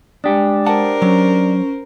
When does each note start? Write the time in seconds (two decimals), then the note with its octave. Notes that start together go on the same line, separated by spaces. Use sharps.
0.24 G#3 D4 G4 D#6
0.66 A#4 C5 F#5 A5
1.02 F#3 C#4